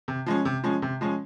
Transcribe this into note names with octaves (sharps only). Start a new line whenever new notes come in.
C3
F3 G#3 C#4
C3
F3 G#3 C#4
C3
F3 G#3 C#4